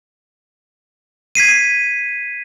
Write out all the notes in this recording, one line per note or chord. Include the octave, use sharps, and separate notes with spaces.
G#6 B6 C7 D#7